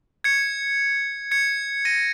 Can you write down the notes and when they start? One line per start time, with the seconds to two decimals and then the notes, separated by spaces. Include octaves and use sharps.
0.24 G#6 C#7
1.31 G#6 C#7
1.85 A#6 D#7